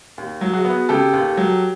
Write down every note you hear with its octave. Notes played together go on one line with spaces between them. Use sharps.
D#2
F#3
F#4 G#4
B3
C#3 G4 A4
D#2
F#3